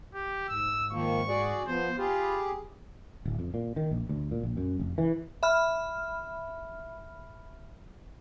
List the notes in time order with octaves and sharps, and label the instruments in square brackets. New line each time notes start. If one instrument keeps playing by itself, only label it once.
[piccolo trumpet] G4
[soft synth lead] G#2 [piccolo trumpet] E6
[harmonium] D#3 F3 A#3 [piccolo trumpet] C#6
[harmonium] F#4 G#4 D5
[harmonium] F3 [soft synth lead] B3 [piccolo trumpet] C5
[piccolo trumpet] F4 [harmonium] G4 G#4 [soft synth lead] B5
[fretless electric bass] D1
F2
A#2
D#3
A#1
D2
A#2
A#1
F#2
F1
E3
[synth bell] E5 B5 F6